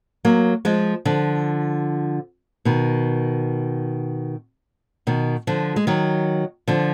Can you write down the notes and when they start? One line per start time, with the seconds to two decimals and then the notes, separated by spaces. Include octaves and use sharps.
0.25 F#3 A#3
0.65 F3 G#3
1.05 D3 F3
2.65 B2 D#3
5.07 B2 D#3
5.47 D3 F3
5.76 G#3
5.87 D#3 F#3
6.68 D3 F3